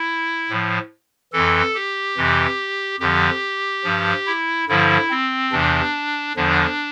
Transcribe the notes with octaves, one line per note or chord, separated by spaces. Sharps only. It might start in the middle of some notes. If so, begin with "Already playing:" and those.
Already playing: E4
A2 F3
F2 E3 A4
G4
F2 C3 E3
F2 D3 F3 G4
G2 F3
E4
G2 D3 F3 E4
C4
E2 C3 E3 D4
E2 D3 F3 D4